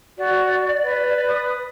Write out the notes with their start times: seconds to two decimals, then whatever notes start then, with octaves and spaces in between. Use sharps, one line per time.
0.18 F#4 D5
0.84 B4
1.28 D#6